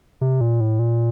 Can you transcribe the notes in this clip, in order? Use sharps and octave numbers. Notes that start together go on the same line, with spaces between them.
C3
A#2
A2
A#2